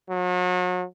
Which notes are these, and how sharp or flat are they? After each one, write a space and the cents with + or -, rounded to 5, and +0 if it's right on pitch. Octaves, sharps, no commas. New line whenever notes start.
F#3 -40